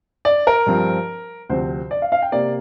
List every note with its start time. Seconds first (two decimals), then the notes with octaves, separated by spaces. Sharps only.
0.25 D5
0.47 A#4
0.66 G2 F3 C4
1.50 D2 C3 F3 C4 C5
1.91 D5
2.02 F5
2.12 F5
2.22 G5
2.32 C3 A#3 D5